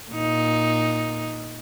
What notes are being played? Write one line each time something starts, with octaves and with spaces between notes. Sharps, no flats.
A#2 D#4